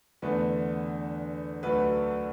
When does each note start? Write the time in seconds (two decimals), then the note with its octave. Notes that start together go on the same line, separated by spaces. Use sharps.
0.22 E2 D3 A3 B4
1.63 D2 D3 F#3 A3 B4